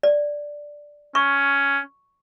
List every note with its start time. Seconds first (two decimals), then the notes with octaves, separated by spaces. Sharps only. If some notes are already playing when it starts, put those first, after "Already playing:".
0.03 D5
1.15 C#4 C#6